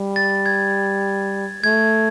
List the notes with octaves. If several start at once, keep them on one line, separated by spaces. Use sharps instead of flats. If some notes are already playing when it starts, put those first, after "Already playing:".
Already playing: G3
A6
G#6
A3 G#6